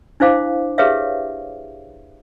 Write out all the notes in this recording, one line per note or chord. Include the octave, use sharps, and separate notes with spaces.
D4 E4 C5 F5 D6
G4 G#4 B4 C#5 E5 F5